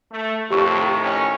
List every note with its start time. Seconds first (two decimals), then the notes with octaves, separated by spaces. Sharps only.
0.12 A3
0.50 F2 A2 D#3 G4 C#6
1.03 C#4